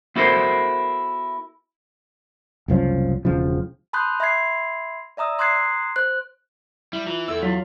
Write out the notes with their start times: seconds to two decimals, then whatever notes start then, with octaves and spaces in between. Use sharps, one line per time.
0.16 B3 E4 F#4 A4 A#4 C5
2.68 F#1 C2 F3 C#4
3.25 E1 C#3 F3
3.93 A5 B5 C6 D#6 F#6 G6
4.20 E5 B5 C6 G#6 C7
5.17 D5 E5 A#5 D#6 E6
5.38 A#5 C6 D#6 F#6 G#6 C7
5.96 C5 F#6
6.93 G3 E4
7.07 E3 F4
7.28 E2 A4 E5 E6
7.42 F#3 E4 F4 B6